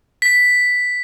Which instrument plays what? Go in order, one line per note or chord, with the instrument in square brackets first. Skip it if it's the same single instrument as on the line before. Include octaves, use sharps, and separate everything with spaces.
[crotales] B6